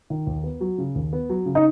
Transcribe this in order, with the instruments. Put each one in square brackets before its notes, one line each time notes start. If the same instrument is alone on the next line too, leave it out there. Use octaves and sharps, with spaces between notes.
[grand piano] D#3
D#2
B3
F#3
C#3
D#2
B3
F#3
C#3
[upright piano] D#4